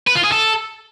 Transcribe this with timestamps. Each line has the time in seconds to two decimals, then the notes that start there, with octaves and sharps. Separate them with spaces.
0.07 B4
0.16 F4
0.24 G#4
0.32 A4